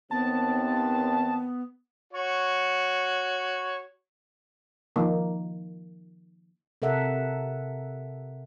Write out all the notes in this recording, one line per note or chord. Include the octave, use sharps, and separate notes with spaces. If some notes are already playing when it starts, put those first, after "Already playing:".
D#2 B3 C4 A5
F#4 C#5
D#3 F3 A#3
C3 A4 A#4 E5 F#5